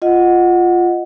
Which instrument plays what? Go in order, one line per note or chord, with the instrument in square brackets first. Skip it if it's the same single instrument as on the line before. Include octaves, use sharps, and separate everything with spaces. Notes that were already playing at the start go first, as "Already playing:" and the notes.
[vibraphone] F4 D#5 F#5